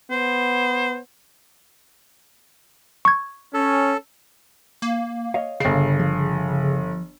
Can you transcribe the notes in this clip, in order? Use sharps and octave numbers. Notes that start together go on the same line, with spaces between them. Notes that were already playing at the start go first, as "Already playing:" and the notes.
B3 C5
C#6 G#6
C#4 A4
A#3
C#5 D#5 F5
G1 C#3 C7
F3